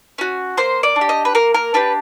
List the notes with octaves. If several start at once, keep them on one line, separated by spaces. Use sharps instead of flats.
C#4 F#4
A#3 C5
D5
D4
G4
D#5
B4
A#3 A#4
A#4
D4 G4 B4